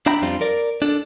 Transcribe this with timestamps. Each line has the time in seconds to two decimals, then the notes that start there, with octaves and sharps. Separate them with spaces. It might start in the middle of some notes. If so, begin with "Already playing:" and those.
0.06 D4 E5 G5 A#5 B5
0.22 F2 G3 C4 D4 F4
0.41 A#4 D5
0.82 D4 A4